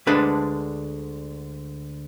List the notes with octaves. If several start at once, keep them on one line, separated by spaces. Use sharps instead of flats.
D2 D3 G#3 D4 B4